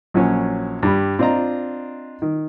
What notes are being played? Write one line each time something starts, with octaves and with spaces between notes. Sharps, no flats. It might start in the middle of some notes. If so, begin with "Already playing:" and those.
A#1 F#3 C#4
G2 G3 G4 B5
C4 D4 F4 D#5 A#5
D#3